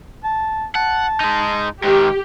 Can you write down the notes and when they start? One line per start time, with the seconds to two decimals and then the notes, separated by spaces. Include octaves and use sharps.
0.24 A5
0.75 F#5 A5
1.20 G#3 D#4
1.84 G#2 D#3 G4